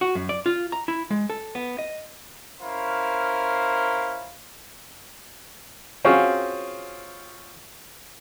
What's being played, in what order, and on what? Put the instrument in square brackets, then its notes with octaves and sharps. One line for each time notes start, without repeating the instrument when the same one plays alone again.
[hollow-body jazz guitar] F#4
F#2
D5
F4
A#5
E4
G#3
A4
B3
D#5
[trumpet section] C#4 E4 A#4 C5 F5
[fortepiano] C4 C#4 F4 F#4 G#4